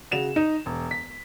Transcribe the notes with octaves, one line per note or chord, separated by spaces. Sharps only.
C#3 F#4 E7 F7
D#4
E1
B6